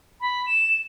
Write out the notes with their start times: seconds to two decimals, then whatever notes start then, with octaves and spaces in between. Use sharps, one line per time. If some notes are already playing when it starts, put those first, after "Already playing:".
0.21 B5
0.46 E7